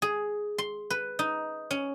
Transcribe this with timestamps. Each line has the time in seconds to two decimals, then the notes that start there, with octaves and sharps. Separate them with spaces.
0.02 G#4
0.58 C6
0.90 B4
1.19 D#4
1.71 C#4